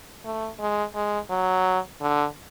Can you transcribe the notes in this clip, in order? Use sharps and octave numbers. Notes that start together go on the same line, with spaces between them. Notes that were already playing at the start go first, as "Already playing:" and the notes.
A3
G#3
G#3
F#3
D3